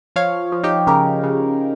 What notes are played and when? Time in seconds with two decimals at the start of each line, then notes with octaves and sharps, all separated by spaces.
0.16 F3 C#5 F5
0.52 F3
0.64 D#4 G4
0.87 C#3 G4 A#4
1.23 C#3